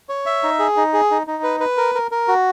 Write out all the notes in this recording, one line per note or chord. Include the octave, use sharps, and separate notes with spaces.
C#5
E5
D#4
G#4
D#4
G#4
D#4
D#4
B4
B4
A#4
A#4
A#4
F#4